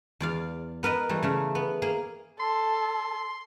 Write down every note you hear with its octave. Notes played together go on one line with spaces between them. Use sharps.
E2 D5 F5
B3 A#4 B4 D#5
E3 G3 A3
C#3 A3 A#4
B3
A#3 G#4 F5
A4 C6